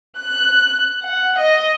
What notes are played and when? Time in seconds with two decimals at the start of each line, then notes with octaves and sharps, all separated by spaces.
0.19 F#6
1.04 F#5
1.39 D#5